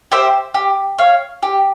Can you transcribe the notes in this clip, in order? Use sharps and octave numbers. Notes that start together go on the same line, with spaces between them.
G4 C5 E5
G4
C#5 F5
G4